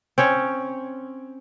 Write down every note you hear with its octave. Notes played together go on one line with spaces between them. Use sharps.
C4 C#4 C#5